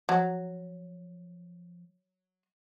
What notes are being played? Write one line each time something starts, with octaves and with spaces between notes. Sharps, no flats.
F3 F#3